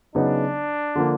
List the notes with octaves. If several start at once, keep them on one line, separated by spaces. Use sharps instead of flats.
C#3 F#3 B3 D4 D#4
D3 F3 A#3